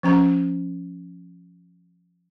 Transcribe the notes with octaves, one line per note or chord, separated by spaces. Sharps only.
F3 C#4 A#5